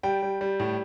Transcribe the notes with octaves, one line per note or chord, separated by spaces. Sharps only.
G3 G5
G3
G3
A2